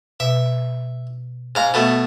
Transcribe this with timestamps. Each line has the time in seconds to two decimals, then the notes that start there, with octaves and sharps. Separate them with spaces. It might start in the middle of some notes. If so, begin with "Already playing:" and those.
0.20 B2 E5
1.55 G#2 F5 A#5
1.74 B2 A3